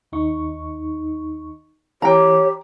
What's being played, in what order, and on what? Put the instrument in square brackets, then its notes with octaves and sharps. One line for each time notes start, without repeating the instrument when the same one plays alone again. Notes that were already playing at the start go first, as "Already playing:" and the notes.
[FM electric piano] D#2 D#4 C#6
[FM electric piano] E3 [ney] G4 [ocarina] C#5 [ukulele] G5 A#5